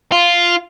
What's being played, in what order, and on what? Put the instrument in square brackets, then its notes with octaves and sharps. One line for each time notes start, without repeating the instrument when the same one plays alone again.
[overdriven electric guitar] F4